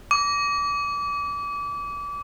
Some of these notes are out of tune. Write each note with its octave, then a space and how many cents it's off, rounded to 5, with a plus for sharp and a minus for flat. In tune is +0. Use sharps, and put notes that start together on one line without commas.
D6 -30